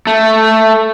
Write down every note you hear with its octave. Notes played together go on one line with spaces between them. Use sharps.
A3